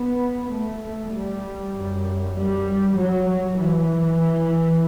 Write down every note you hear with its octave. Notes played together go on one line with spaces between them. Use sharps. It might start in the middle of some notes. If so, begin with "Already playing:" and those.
Already playing: B3
A3
G3
F#2
G3
F#3
E3